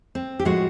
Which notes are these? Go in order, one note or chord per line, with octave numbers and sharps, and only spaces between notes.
C4
G4
A2 F3 G#3 F#4